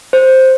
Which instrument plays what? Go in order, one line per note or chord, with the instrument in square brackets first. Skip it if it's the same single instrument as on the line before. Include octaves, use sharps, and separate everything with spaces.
[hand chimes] C5